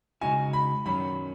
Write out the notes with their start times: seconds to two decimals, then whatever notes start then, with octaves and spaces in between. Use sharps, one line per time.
0.21 C#3 G#3 D#4 F#4 G#5
0.53 B5
0.86 F#2 D#3 F#3 C#4 B5